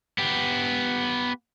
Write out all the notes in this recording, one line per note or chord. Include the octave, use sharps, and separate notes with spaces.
B3 G4